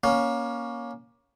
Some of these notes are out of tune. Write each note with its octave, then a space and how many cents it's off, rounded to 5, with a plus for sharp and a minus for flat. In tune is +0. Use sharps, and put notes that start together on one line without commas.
A#3 +20 C#4 +10